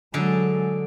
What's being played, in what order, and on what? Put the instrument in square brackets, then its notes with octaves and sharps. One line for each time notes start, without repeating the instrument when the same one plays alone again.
[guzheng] D3 G#4 A4 [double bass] F#3 G#3